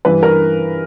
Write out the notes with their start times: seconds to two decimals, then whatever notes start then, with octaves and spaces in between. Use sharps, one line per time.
0.05 G2 E3 B4
0.23 A#4